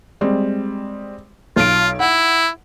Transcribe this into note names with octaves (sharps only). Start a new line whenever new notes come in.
G3 G#3 C4
B1 F4 D7
E4 F#5